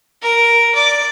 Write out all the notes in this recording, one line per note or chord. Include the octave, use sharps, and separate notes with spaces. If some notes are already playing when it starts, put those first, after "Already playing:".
A#4
D5